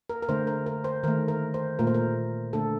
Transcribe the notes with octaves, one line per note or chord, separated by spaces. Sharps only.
A#4
A#4
D3 A3 C5
A#4
A#4
C5
D#3 A3 A#4
A#4
C5
A#2 A3 A#4
C5
A#4
D3 A3 A4